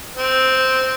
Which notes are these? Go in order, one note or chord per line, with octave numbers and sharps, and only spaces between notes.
C4